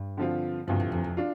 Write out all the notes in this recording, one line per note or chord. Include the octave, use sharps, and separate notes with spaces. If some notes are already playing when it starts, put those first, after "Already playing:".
Already playing: G2
D3 F3 C4 F4
D2 G2 C3 F3
A2
F2
F2
D4 F4